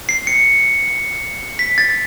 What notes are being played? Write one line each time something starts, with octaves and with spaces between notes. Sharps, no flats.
C7
C#7
B6
A6